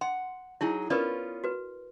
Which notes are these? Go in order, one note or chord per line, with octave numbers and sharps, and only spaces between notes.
F#5 C6
F#3 D#4 E4 G#4
B3 C#4 F4 A#4 B4 D5
F#4 B4